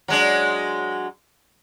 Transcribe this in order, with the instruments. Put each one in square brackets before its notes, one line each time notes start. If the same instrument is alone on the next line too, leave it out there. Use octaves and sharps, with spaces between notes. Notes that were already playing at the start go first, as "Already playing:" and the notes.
[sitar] F#3 G#3 D4